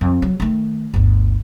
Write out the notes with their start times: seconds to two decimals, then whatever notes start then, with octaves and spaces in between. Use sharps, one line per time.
0.01 F2
0.22 F#3
0.40 D#3 A3
0.94 G1 D2